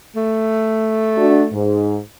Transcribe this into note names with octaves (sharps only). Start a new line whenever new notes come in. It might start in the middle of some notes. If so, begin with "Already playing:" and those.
A3
D4 F#4
G#2